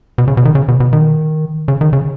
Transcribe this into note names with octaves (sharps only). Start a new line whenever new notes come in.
B2
C#3
B2
D#3
C#3
B2
B2
D#3
C#3
D#3
C#3